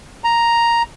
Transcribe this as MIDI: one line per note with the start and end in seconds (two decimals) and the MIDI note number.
0.24 0.83 82